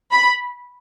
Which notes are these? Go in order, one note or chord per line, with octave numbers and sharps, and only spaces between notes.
B5